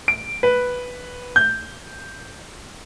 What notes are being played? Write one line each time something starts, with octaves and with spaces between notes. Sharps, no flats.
D7
B4
G6